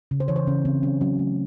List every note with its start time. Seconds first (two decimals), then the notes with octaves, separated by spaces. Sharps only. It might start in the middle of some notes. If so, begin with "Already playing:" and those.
0.11 C#3
0.20 C5
0.28 E3 C#5
0.36 C5
0.47 C#3 C#4
0.65 C#3 C4
0.83 F#3 C#4
1.01 F#3 C#4
1.19 A3